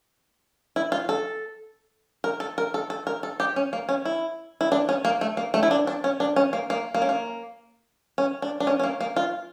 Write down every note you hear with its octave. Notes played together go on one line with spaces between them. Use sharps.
E4
F4
A4
A#4
A4
A#4
A4
A4
A#4
A4
G4
C#4
A#3
C#4
E4
E4
D4
C#4
A#3
A3
A#3
A3
E4
D4
D4
C#4
D4
C#4
A#3
A#3
A#3
C#4
A#3
C#4
D4
D4
C#4
C#4
A#3
A#3
F4